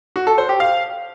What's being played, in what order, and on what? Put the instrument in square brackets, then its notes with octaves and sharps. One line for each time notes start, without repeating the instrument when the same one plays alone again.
[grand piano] F#4
A4
C5
G4
F5